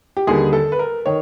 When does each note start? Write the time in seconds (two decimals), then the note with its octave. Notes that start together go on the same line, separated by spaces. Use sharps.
0.17 G4
0.27 D#2 D3 G3 G#4
0.53 A4
0.72 B4
0.79 A#4
1.06 D#3 C#5